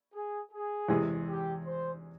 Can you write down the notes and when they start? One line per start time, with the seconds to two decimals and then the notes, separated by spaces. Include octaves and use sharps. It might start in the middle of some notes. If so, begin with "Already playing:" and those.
0.14 G#4
0.51 G#4
0.89 E2 C3 E3 G#3
1.27 G4
1.64 C5